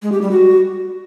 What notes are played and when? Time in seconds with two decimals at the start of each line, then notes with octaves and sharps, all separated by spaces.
0.03 G#3
0.12 G4
0.22 G3
0.31 F#4